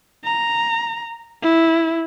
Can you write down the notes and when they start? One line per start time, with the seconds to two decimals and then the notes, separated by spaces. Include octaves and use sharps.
0.24 A#5
1.42 E4